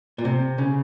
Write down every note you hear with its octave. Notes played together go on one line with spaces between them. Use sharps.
A#2
C3
C#3